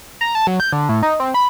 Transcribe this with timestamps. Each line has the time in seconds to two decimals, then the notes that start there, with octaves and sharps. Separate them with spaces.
0.21 A#5
0.35 A5
0.47 F#3
0.60 G6
0.73 D3
0.89 A2
1.03 D#4
1.20 C4
1.34 B5